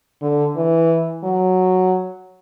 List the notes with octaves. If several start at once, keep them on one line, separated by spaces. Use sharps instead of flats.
D3
E3
F#3